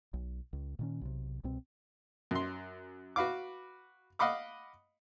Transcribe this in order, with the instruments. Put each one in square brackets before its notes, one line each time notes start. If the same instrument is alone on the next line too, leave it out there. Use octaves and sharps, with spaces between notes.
[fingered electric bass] B1
C#2
A#2 D#3 C#4
B1 C3
C2 B2 C4
[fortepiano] F#2 C6
F#4 B4 F5 D6
D#5 F5 F#5 B5 D6 D#6